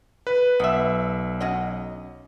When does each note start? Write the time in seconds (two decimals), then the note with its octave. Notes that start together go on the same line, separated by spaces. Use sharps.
0.27 B4
0.60 B1 B3 E5
1.41 C#4 F#4 D#5